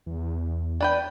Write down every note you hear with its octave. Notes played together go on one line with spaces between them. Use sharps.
E2
D4 B4 G5